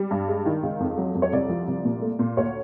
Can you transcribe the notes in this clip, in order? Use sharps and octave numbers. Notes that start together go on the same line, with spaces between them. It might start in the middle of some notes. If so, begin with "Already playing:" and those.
Already playing: G3
G2
G#3
D#3
C#2
F2
F#3
F2
C#5
C2 D5
F3
C2
A#2
A3
A#2
D2 C#5